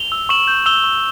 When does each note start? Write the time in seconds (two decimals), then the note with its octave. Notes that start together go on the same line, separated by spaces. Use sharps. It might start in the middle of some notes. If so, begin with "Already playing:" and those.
Already playing: F7 G7
0.12 E6
0.29 C#6 E7 F#7
0.48 G6
0.66 E6 F7 G7
0.84 C#6